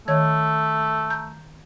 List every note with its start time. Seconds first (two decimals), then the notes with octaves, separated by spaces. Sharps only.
0.08 D#3 A3 C#5 G#6
1.10 A#5 G6